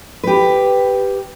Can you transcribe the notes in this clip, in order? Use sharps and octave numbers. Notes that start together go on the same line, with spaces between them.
G4 B4